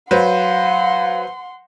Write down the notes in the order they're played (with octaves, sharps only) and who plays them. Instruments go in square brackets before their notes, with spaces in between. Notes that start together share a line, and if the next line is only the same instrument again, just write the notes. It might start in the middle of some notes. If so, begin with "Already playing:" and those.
[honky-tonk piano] F#3 B4 C5 [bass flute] F5 [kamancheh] F#5 C6